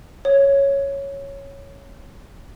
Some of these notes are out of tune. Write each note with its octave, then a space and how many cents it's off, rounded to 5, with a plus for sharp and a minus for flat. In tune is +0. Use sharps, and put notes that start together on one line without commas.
C#5 +0